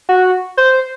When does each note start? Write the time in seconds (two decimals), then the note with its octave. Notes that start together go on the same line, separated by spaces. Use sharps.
0.09 F#4
0.57 C5